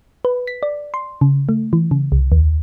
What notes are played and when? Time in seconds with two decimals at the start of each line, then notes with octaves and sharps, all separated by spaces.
0.25 B4
0.47 B6
0.63 D5
0.94 C6
1.21 C#3
1.49 A3
1.73 E3
1.91 C#3
2.12 C2
2.32 D#2